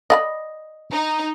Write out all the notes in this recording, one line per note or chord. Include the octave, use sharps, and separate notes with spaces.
D5 D#5 F#5 B5
D#4